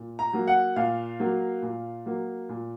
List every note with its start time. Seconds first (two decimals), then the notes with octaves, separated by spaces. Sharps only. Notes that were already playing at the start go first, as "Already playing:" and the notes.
Already playing: A#2
0.19 A#5
0.33 F#3 A#3
0.47 F#5
0.76 A#2 F5
1.20 F#3 A#3
1.62 A#2
2.06 F#3 A#3
2.49 A#2